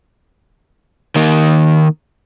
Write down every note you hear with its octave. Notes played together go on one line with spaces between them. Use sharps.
D#3 A#3